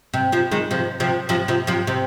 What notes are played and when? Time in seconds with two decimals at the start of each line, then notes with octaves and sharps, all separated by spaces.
0.14 C3
0.32 C3 F3
0.51 D#3 G#3
0.71 C3 F3
1.00 C3 F3
1.29 C3 F3
1.48 C3 F3
1.67 C3 F3
1.87 C3